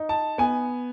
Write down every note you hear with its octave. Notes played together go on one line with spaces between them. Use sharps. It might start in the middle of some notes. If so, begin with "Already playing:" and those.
Already playing: D#4
A5
B3 G#5